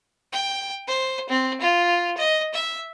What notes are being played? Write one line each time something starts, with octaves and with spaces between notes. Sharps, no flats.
G5
C5
C4
F4
D#5
E5